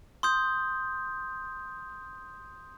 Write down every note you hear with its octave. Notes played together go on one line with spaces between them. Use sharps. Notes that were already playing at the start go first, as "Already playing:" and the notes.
C6 D#6 G6